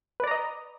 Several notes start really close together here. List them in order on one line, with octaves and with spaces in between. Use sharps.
B4 D5 A#5 D#5